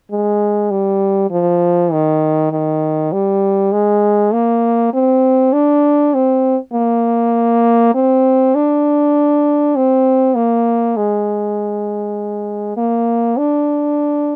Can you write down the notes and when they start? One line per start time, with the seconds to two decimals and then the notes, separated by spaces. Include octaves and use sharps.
0.11 G#3
0.71 G3
1.31 F3
1.92 D#3
2.52 D#3
3.12 G3
3.72 G#3
4.33 A#3
4.93 C4
5.53 D4
6.14 C4
6.73 A#3
7.94 C4
8.55 D4
9.76 C4
10.36 A#3
10.96 G#3
12.77 A#3
13.38 D4